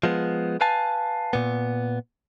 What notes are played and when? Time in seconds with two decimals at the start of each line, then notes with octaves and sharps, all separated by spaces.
0.03 F3 G#3 B3
0.61 B4 F5 G#5 A5
1.33 A#2 B3